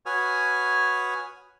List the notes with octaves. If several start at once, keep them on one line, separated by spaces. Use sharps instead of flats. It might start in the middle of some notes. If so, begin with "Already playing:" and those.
F#4 B4 C#5 G#5 D#6 F6